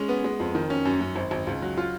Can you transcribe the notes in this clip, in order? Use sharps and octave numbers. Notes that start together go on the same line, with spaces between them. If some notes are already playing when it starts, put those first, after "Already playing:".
Already playing: G#3 C#4
B3
G#3
F2
D#3
C#4
F#2
F#2
G#1
G#1
C#2
F#3
F4